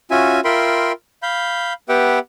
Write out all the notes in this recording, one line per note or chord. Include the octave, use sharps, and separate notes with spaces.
C#4 F4 F#4 E5 G#5
F4 A#4 E5 G5 B5 C6
F5 B5 G6
B3 G4 B4 E5 F#5 G5